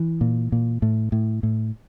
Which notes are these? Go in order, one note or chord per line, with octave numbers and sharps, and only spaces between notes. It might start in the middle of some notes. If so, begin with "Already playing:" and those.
Already playing: E3
A#2
A#2
A2
A2
A2